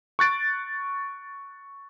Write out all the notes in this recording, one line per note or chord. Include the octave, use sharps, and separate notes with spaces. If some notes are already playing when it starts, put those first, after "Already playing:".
C#6 F#6 A6 D7